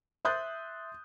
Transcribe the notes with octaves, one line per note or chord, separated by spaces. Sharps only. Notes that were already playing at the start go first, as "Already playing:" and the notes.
E5 C6 D#6 F#6 G6 A6